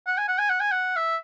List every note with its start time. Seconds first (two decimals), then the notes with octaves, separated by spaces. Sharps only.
0.07 F#5
0.18 G#5
0.28 F#5
0.38 G#5
0.49 F#5
0.60 G#5
0.71 F#5
0.96 E5